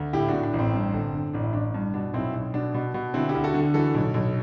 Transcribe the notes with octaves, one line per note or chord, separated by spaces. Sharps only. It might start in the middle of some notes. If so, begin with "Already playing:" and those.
Already playing: D2
A2 E4 G4
D4 F#4
A2
D4
A1
C4
G2
G1
D3
A1 D4
E4
A1 D4
G2
B2 D4
B1 C4 E4
B1
B2 D4
B2
B2
D3 C4 E4
E4 G4
D2
F#4 A4
D3
E3 F#4 A4
B1
B1